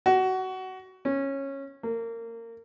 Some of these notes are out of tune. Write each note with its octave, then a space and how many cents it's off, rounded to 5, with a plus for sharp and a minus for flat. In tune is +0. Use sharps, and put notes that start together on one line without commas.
F#4 +20
C#4 -15
A#3 -25